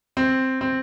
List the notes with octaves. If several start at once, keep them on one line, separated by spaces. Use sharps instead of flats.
C4
C4